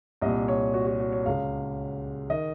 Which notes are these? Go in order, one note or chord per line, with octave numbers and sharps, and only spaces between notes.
C2 A#2 D#5
C#5
F#4
F#4
F#4
C#5
C#2 C#3 F5
D#3 D#5